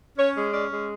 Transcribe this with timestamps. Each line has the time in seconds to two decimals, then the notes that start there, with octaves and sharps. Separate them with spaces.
0.18 C#4 C#5
0.35 G#3
0.53 C#4 D5
0.71 G#3